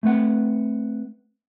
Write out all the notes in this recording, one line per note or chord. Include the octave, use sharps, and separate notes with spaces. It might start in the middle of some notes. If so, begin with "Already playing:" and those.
A3 C4 B4 F#5